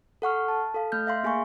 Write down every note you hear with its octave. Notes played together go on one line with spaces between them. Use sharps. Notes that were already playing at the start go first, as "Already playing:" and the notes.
A4 F#5 C#6 F6
A5
A4 F5
A3 F6 G6
E5 F5 C6
A#3 G#4 F5 G#5 C#6